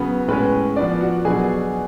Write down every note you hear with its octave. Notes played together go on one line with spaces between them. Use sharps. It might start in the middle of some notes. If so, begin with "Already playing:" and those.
Already playing: C#3 F#3 B3 B4
A2 G#3 B3 C#4 B4
F3 B3 D4 D5
F#4 F#5
B2 F#3 B3 D4 G#4 G#5